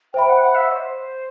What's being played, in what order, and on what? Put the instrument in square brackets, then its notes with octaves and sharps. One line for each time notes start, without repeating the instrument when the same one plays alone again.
[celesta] C5 E5 B5 [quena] G5
[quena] F#5
F#5
E5
E5
C5